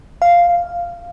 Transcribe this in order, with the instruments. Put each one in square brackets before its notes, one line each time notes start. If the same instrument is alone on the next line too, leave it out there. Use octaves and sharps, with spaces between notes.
[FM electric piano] F5